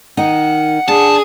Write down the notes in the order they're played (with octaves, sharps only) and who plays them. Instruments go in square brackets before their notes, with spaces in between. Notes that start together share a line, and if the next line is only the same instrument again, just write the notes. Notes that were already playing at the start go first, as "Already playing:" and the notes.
[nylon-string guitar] D#3 D#4 [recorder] F#5
[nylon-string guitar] D4 [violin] G#4 [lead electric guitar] A5